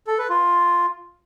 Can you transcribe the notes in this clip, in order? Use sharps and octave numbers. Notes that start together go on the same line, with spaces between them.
A4
B4
F4